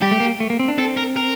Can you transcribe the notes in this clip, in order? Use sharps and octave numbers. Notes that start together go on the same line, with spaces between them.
G3 G4
A3
A#3
A3
A#3
C4
D4
C4 A4
A#4
A#4